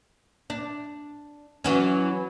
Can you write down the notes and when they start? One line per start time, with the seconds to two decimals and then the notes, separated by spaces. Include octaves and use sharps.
0.50 D4
1.64 E3 F#3 C#4